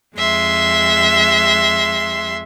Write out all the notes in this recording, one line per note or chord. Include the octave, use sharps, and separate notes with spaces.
F2 G#3 E5 C6